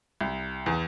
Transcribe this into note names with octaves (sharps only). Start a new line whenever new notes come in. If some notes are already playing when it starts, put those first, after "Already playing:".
C2
E2